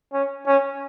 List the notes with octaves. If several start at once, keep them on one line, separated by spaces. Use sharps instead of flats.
C#4
C#4